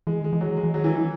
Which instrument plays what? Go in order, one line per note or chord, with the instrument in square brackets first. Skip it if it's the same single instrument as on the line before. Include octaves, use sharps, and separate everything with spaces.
[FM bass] E3 [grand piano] G#3
[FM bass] D#3 [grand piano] G#3
[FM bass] E3
[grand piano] F#3
G#3
[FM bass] E3
[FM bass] D#3 [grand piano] F#3
[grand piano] E3
E3